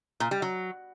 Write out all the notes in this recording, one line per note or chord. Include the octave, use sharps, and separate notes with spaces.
A#2
G3
F#3